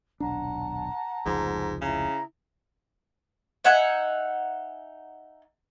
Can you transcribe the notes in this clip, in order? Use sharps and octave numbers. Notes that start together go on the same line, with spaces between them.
D#1 B1 D4 F#5 A5 A#5
F1 C#2 G#2 F3
C#3 E4 A#5
D#4 E5 F#5 G#5